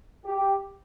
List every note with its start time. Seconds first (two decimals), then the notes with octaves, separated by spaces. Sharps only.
0.25 G4